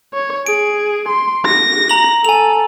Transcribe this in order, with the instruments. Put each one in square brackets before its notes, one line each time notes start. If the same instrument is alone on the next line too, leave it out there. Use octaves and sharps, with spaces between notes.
[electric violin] C#5
[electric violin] G#4 [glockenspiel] D7
[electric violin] C6
A#6
[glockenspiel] A#5 F#7
[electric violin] A4 [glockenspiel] G#5 F7